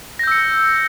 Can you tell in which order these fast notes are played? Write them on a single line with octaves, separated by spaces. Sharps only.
A#6 G6 E6 C#7